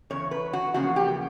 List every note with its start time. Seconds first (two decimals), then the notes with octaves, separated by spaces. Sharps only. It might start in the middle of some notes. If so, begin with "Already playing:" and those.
0.10 E2 C#3 C#5
0.31 B4
0.53 F#4
0.74 E2 C#3 F3 A#3 F#4
0.96 G4